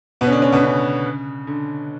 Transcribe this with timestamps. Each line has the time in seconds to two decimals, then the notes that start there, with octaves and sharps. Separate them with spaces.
0.21 B2 B3
0.27 C#4
0.31 D3 D4
0.42 C#3 C#4
0.52 B2 B3
0.63 C#3
1.47 D3